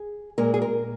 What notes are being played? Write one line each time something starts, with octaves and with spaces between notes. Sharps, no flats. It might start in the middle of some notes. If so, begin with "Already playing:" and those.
Already playing: G#4
A#2 G#3 A#4
G#4
A#4